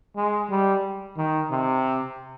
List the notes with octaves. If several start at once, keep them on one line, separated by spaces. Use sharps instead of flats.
G#3
G3
D#3
C3